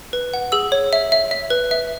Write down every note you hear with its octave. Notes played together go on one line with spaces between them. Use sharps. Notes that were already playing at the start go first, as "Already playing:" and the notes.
B4
F#5
G#4 E6
C#5
E5
E5
E5
B4
E5